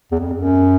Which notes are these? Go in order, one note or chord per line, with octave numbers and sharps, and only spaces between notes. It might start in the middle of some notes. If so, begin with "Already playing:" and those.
E2
F2
F#2